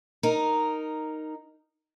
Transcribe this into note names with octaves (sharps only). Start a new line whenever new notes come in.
D#4 A#4